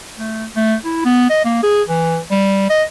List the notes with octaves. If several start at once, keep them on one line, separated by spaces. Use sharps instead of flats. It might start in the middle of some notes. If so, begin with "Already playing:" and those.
A3
A3
E4
B3
D#5
A#3
G#4
E3
G3
D#5